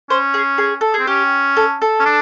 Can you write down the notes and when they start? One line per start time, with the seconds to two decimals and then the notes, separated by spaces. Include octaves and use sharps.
0.10 C#4 C5
0.34 G#4
0.58 G#4
0.81 A4
0.94 G#4
0.99 C4
1.07 C#4 G4
1.57 A4
1.82 A4
2.00 C#4
2.06 D4